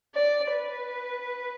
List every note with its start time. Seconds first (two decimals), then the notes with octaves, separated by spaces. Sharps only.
0.15 D5
0.53 B4